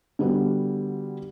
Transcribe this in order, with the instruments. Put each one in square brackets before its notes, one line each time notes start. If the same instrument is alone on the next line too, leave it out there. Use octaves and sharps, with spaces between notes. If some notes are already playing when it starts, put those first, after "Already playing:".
[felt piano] D3 G3 B3 F#4